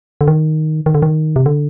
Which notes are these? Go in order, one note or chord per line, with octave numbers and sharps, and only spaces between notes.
D3
D#3
D#3
D3
D#3
C3
D3